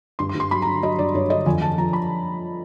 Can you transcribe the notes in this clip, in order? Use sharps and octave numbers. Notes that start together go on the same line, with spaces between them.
G2 C6
C6
G2
C6
F#3 B5
A#5
D3
F#3 D#5
G2 D5
G2 C#5
D3 D#5
F2 G#5
F2 A5
F2 A#5
B5